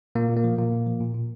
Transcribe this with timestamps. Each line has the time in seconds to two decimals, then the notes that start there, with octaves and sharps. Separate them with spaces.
0.15 A#2 A#3
0.29 A#2
0.37 A#3
0.44 F3
0.58 A#2 A#3
0.72 A#2
0.87 F3
1.00 A#2
1.14 A#2